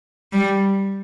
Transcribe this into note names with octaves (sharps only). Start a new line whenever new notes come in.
G3